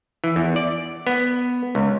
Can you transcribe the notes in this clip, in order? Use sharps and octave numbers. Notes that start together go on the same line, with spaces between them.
E3
E2
D5
B3
C#2